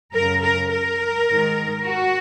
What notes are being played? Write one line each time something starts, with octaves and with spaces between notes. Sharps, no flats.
F#2 C#3 A#4
A#4
A#4
G#2 D#3
F#4